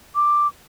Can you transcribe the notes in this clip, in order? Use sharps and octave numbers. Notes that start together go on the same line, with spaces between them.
D6